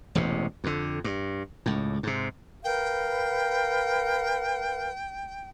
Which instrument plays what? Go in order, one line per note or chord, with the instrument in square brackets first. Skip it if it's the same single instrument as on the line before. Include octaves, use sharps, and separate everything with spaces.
[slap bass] E1 A1 E2 C3
F2 D3
G2
C#2 A2
G#2 C3
[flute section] A#4 B4 F5 [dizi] G5